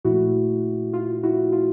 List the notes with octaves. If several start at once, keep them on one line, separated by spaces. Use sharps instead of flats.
A#2 F3 A3 E4 F#4
F4
E4 F#4
F4